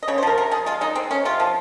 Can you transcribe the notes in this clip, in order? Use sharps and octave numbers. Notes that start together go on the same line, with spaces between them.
D#5
C#3 C#5
C5
F3 A#4
C3 A#4
F3 G#4
G#3 F4
G#3 D#4
G#3 C4
G#3 C#4
C3 F4
F3